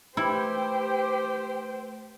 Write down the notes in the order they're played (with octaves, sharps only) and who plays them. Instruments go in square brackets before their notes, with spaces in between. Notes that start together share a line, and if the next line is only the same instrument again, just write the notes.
[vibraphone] A3 B4 E6 [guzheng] E4 [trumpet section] G4 [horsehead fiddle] C5 G5